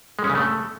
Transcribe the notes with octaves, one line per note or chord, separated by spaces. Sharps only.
G#3
C#4
C#3
A3